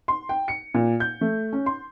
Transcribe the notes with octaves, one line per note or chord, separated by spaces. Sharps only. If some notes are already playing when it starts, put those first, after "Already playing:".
C6
G5
C#7
A#2
G6
A3
C#4
C6